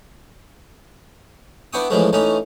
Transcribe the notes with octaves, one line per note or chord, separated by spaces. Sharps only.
B3 D4 E4 G5 C#6 D#6
A2 C#3 E3 F3 G#3 A3
E3 A3 C#4 D#4